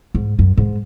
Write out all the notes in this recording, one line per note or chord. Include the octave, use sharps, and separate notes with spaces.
G#2
F#2
G#2